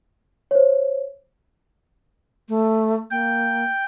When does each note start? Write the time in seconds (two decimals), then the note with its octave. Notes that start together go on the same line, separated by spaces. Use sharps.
0.51 C5 C#5
2.49 A3
3.11 A#3 G5